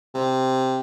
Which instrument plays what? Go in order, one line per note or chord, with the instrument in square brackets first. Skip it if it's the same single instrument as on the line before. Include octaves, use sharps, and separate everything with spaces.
[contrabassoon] C3